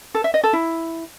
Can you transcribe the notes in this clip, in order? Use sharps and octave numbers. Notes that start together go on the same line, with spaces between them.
A4
E5
D#5
A4
E4